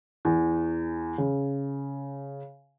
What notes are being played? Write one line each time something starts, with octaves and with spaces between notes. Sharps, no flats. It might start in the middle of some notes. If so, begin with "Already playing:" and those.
E2
C#3